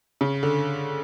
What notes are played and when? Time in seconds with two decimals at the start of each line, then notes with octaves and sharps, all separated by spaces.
0.21 C#3
0.43 D3